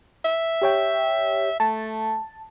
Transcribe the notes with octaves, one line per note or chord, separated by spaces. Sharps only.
E5
G4 C#5 G5
A3 A5